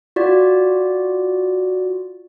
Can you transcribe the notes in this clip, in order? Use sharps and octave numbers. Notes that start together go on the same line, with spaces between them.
F4 F#4 D5